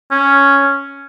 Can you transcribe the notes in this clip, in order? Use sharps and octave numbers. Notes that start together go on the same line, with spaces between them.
C#4